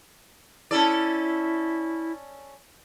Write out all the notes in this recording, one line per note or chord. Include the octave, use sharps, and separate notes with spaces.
C#4 E4 A4 D5